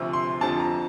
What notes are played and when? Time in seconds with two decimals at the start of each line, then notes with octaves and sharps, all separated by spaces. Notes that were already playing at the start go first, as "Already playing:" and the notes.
Already playing: D2 C3 F3 E6
0.13 C6
0.41 F2 D3 F3 A5
0.60 A#5